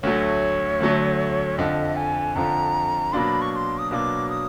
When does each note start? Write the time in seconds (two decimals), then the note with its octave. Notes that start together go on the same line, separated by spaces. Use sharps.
0.03 D2 D3 F#3 A3 C#5
0.80 D2 D3 F#3 A3
1.58 F2 D3 F3 D#5
1.96 G#5
2.35 F2 D3 F3 A#5
3.12 B2 F#3 A#3 D4 B5 C6
3.41 C#6
3.52 C#6
3.56 C6
3.78 D#6
3.90 B2 F#3 A#3 D4 D6 D#6
4.29 D#6